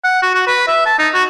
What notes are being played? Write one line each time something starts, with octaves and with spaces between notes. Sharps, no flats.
F#5
F#4
F#4
B4
E5
A5
D#4
F#4